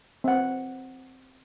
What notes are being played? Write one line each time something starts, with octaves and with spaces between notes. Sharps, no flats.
C4 F#5